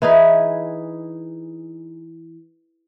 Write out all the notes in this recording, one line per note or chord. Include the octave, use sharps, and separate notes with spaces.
E3 D#4 G#4 B4